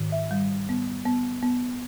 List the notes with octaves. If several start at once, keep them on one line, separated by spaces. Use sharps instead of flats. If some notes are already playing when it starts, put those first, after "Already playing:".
Already playing: G#2 D#3
E5
G3
B3
B3
B3